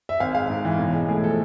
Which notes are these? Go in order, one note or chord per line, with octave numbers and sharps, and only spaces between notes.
E5
G#1 F5
G#3 F5
G#2
E3
B1
G#3
A2 G#4
F3 A4